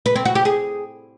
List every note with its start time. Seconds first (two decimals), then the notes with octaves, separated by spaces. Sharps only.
0.06 B4
0.16 C4
0.25 F#4
0.35 G4
0.45 G#4